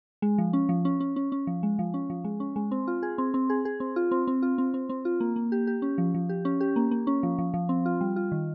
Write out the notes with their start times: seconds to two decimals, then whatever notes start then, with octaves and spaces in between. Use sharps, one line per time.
0.22 G#3
0.38 F3
0.53 C#4
0.69 F3
0.85 C#4
1.00 C#4
1.16 C#4
1.32 C#4
1.47 F3
1.63 G#3
1.79 F3
1.94 C#4
2.10 F3
2.24 G#3
2.40 C#4
2.56 G#3
2.71 C4
2.87 F4
3.03 G#4
3.18 C4
3.34 C4
3.50 G#4
3.65 G#4
3.80 C4
3.96 F4
4.11 C4
4.27 C4
4.42 F4
4.58 C4
4.74 C4
4.89 C4
5.05 F4
5.20 A#3
5.36 A#3
5.52 G4
5.67 G4
5.82 C#4
5.98 F3
6.14 F3
6.29 G4
6.45 C#4
6.61 G4
6.76 A#3
6.91 A#3
7.07 C#4
7.23 F3
7.38 F3
7.54 F3
7.69 C4
7.86 F4
8.01 G3
8.16 F4
8.32 D#3